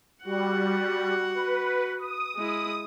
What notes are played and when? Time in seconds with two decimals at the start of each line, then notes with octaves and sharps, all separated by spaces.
0.25 G3 F#4 F#5
1.34 B4
1.99 D#6
2.36 G#3 E4 D#6